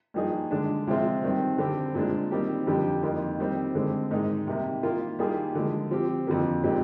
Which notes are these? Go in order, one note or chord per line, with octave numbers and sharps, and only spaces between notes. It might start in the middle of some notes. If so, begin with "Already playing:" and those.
G2 F3 A#3 D#4 G#4
D3 G#3 D4
C3 F3 G#3 C4 F4
G2 D#3 G3 C4
D3 G3 C4 G4
A#2 G#3 D4
D#3 G3 C4 G4
F2 D3 G3 D4 G4
F2 D#3 A#3 F4
D#3 G3 C4
D3 G#3 C4
G#2 D#3 G#3 D#4
C3 D#3 G3 A#3
D#3 A#3 F4
D#3 G3 A#3 F4 G#4
D3 F3 G#3
F3 C4 G4
F2 D3 F3 A#3
A#2 G#3 C4 D#4 G4